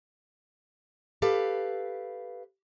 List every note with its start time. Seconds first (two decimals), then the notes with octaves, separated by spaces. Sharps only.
1.22 G4 A4 B4 F5